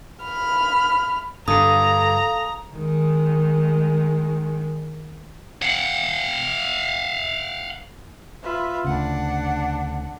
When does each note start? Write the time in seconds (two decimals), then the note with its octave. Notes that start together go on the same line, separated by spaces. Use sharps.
0.24 B5 F6
1.48 G2 D3 A4 F5 A5 A#5 D#6
2.74 D#3 G#3
5.62 F5 F#5
8.43 F4 B4 E5
8.84 D2 C#3 D4 F#5